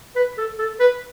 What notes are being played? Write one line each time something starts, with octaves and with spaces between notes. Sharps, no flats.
B4
A4
A4
B4